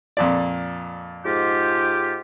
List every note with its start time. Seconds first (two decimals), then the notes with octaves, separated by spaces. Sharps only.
0.17 F2 A#2 D5
1.26 G#2 F4 G4